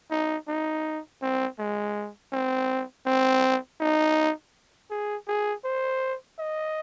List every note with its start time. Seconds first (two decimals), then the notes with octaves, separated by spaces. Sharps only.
0.11 D#4
0.48 D#4
1.22 C4
1.59 G#3
2.33 C4
3.06 C4
3.80 D#4
4.90 G#4
5.28 G#4
5.65 C5
6.39 D#5